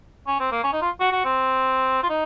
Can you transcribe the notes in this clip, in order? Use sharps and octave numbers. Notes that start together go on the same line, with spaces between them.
C#4
C4
A#3
C#4
D#4
F4
F#4
F#4
C4
F4
D#4